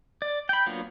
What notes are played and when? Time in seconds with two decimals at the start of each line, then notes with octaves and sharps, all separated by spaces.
0.22 D5
0.49 G5 B5
0.66 F#3 A#3 B3 D4 F4